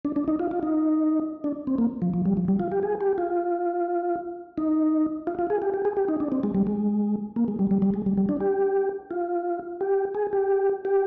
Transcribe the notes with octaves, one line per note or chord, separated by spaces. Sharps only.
D4
D4
D#4
F4
F4
D#4
D4
C4
A#3
F3
F3
G3
F3
G3
F4
G4
G#4
G4
F4
D#4
F4
F4
G#4
G4
G4
G#4
G4
D#4
D4
C4
G#3
G3
G#3
A#3
G#3
G3
G3
G3
G#3
G3
G3
D4
G4
F4
G4
G#4
G4
G4